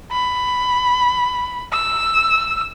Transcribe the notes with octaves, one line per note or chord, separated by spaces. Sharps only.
B5
E6